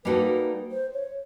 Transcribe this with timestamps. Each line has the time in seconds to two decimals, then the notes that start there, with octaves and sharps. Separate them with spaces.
0.05 G3 A#3 D#4 F#4 A4 B4
0.71 C5
0.93 C#5